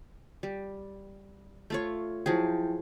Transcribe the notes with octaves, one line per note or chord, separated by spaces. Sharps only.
G3
A3 F4 C#5
F3 F#3 E4 G#4 G5